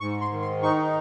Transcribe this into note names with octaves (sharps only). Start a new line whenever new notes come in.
G#2 C#6
C6
D#3
C6
D#4 C#6